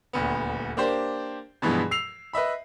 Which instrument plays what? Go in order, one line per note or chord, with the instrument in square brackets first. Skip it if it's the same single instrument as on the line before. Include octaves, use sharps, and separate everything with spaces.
[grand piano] D#1 D2 B3
A#3 D4 G4 C5
G2 B2 E3 F3 G#3 B3
E6 C7 F7
B4 D#5 E5 B5